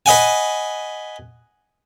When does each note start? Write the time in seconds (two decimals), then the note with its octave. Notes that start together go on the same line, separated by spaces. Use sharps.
0.06 B4 D#5 F#5 G#5